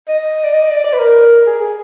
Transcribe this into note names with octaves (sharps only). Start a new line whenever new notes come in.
D#5
D5
D#5
D5
D5
B4
A#4
G#4
G#4